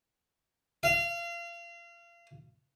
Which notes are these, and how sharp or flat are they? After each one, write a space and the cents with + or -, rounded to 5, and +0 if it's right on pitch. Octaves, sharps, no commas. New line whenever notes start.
F5 -30